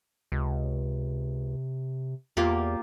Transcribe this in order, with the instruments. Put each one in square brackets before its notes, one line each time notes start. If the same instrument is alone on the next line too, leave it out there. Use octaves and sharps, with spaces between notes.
[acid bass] C#2 [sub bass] C3
[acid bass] E2 [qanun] A#3 F4 G4